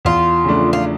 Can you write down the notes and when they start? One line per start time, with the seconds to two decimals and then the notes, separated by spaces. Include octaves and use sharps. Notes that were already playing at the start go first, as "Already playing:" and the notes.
0.05 E2 F4
0.45 C#3 F3 A3 D4
0.73 F4